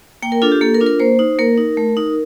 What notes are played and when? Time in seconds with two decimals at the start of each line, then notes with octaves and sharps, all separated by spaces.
0.22 A#3 G5
0.32 A#4
0.42 D4 F4 A4
0.52 G4
0.61 A#3 A4
0.74 A#4
0.81 D4 F4
0.86 A#4
1.00 A#3 C5
1.19 D#4
1.39 A#3 A#4
1.58 D#4
1.77 A3
1.97 D#4